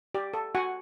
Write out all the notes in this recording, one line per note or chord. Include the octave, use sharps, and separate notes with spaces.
G4 D5
A4
F#4 F#5 G#5 C#6